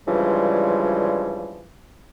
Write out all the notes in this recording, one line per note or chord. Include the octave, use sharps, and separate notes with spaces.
G2 C#3 E3 F3 G3 G#3